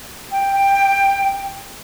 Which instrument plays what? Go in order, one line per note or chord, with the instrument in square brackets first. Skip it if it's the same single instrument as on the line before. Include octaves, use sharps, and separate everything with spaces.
[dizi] G5